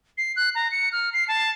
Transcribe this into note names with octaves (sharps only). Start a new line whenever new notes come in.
C7
F#6
A#5
C#7
F6
C7
A5